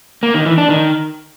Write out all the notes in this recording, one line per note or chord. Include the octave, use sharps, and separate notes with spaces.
A#3
D#3
E3
D4
D#3